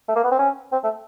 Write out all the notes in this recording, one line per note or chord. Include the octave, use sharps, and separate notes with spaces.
A3
A#3
B3
C4
C#4
C4
A3